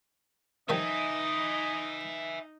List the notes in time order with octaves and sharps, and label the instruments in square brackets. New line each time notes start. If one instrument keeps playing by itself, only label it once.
[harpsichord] D#3 F3 G3 [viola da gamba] D#4 [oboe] D#5 [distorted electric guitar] E5 G#5